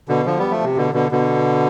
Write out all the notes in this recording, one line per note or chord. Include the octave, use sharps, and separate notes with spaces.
B2 D3
D3 F3
G3 B3
F3 A3
C3
B2 D3
B2 D3
B2 D3